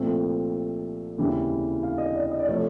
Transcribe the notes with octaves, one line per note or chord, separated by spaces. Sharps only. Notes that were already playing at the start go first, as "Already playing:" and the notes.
Already playing: C2 A#2 F3 A3 C4
F1 D#2 C#3 E3 G3
F5
D#5
D5
D#5
D5
C3 F3 A3 C#5